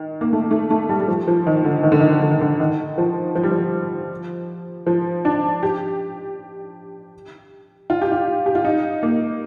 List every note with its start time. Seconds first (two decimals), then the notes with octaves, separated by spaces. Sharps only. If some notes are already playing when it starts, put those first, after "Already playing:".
Already playing: D#3
0.21 A#3
0.33 A3
0.51 A3
0.71 A3
0.89 G3
1.00 G3
1.08 F3
1.28 F3
1.47 D#3
1.65 D3
1.83 D#3
1.92 D3
2.00 D#3
2.22 D3
2.31 D#3
2.41 D3
2.60 D#3
2.98 F3
3.35 F3
3.43 G3
3.52 F3
4.87 F3
5.25 D4
5.63 G4
7.90 F4
8.02 G4
8.12 F4
8.46 G4
8.55 F4
8.65 D#4
9.03 A#3